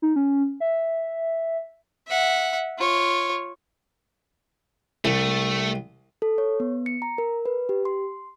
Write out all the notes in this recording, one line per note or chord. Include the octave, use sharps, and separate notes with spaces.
D#4
C#4
E5
E5 F#5
F4 C#5
C2 A3
A4
C#5
B3
C#7
A#5
A#4
B4
G4
C6